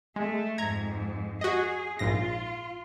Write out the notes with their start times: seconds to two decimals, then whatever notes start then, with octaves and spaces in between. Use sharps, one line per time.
0.16 G#3 A3
0.58 F2 G#2 A#5 G#6
1.41 F#4 G#4 D#5
1.99 A#1 G#2 F4 A#6